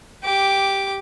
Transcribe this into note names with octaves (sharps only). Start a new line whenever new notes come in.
G4 D6